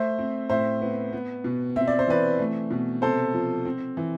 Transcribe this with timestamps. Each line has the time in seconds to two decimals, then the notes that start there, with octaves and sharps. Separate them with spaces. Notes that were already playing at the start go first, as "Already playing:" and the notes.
Already playing: A3 C5 E5
0.18 C4
0.49 A2 C5 E5
0.82 B3
1.13 B3
1.44 B2
1.76 C4 E5
1.88 D5
1.99 C5
2.07 E3 B4 D5
2.39 A3
2.71 B2
3.02 C3 A4 C5
3.33 F3
3.65 C4
3.97 E3